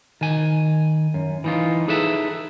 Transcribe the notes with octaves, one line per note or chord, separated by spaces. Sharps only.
D#3 G#5
F#2
E3 D#4 F4
D#4 G#4 A4 B4 E5